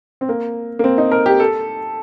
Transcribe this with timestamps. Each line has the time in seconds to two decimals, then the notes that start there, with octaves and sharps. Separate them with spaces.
0.21 C4
0.29 A#3
0.79 A#3
0.84 C4
0.98 D#4
1.12 A#4
1.26 G4
1.40 A4